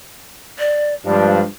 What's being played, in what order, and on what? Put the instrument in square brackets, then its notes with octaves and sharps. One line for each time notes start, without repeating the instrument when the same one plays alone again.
[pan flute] D5
[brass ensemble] G2 F3 D4 [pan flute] G#3